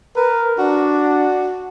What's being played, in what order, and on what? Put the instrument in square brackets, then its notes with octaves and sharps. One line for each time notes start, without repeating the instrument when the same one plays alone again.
[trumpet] A#4 [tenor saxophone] B4
[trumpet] D4 [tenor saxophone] F#4